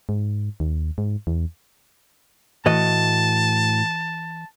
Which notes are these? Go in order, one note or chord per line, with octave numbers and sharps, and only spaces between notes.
G#2
D#2
G#2
E2
A2 E3 F#4 D#5 A5